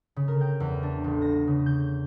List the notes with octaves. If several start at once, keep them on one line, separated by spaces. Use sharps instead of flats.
C#3
A#4
G5
E2
D4
A1
A#6
C#3
G6